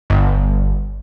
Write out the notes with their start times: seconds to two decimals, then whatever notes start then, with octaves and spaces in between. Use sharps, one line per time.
0.10 G1